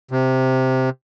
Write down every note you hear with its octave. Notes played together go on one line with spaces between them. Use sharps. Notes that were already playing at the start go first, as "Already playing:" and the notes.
C3